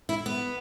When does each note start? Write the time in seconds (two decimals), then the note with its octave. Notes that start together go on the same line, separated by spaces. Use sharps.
0.09 E4
0.26 B3